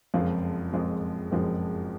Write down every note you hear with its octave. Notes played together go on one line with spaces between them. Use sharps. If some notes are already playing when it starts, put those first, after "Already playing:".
F#1 F2 F3 G#3 F5
F#1 F2 F3 G#3
F#1 F2 F3 G#3